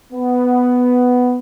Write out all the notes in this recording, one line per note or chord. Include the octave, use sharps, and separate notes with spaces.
B3